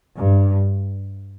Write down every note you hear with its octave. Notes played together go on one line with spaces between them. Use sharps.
G2